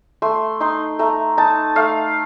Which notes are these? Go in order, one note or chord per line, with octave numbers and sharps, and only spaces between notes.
A3 C6
D#4 C6
A3 A#5
D#4 A5
A3 F5